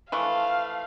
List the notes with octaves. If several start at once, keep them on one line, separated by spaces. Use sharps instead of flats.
E3 F3 A3 F5